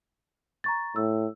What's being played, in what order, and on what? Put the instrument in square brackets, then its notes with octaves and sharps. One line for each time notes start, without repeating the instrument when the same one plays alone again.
[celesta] A#5 C#6 A6
[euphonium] A2 [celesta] E6